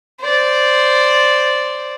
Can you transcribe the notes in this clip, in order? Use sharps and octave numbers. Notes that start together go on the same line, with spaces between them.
C5 D5